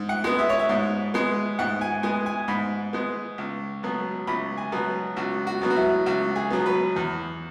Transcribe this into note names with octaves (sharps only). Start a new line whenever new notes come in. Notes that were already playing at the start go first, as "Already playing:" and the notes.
Already playing: G#2
F#5
G#3 B3
E5
C#5
E5
G#2
G#3 B3
G#2 F#5
G#5
G#3 B3 G#5
G#5
G#2 B5
G#3 B3
C#2
B2 F#3 B3
C#2 B5
G#5
B2 F#3 B3
C#2 F#4
F#4
B2 F#3 B3
F#4
E4
C#2 F#4
G#4
B2 F#3 B3
B4
E2